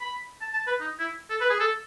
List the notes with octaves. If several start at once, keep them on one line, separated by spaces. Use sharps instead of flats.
B5
A5
A5
B4
D#4
E4
A4
B4
G#4
A4